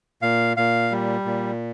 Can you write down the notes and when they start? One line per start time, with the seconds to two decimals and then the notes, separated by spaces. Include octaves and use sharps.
0.22 A#2 F5
0.57 A#2 F5
0.92 G3
1.25 A#2